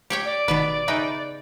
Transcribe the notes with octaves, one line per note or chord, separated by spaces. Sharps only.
G4 C#5 G5
D5
G1 B2 D#3 B3 B4
C#3 D#4 E5 G5 B5 F#6